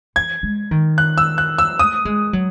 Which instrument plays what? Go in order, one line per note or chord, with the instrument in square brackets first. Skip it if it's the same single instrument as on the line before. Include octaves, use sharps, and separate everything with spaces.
[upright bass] E3 [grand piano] G#6
[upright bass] G#3
D#3
[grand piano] F#6
E6
F#6
E6
[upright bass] A3 [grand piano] D#6
[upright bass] G#3
F#3